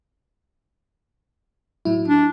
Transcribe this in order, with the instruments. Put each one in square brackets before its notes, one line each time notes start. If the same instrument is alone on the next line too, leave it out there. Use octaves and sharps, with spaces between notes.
[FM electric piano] A2 F#3 E4
[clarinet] D4